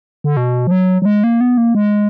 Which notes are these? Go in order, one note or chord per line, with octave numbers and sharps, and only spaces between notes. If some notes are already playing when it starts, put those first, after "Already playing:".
D3
B2
F3
F#3
F#3
G#3
A#3
B3
A#3
G#3